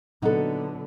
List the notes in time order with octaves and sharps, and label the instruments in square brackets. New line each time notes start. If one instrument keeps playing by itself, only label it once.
[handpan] A#2 F#3 F#5 [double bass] D3 B3 [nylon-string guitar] D#4 A4